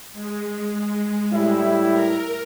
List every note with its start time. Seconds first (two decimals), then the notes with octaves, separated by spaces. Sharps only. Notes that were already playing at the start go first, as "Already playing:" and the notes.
0.12 G#3
1.32 A2 G3 E4
1.90 A#4